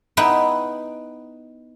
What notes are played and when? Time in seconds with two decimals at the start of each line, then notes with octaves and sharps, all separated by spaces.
0.17 B3 D#4 E4 B4 G5